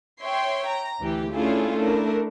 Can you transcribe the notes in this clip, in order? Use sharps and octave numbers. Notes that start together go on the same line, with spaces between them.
C#5 E5 G5 C6
A#5
D2 E3 G4
A3 C#4 D4 E4 F4 G#4
A3 D4 E4 A#4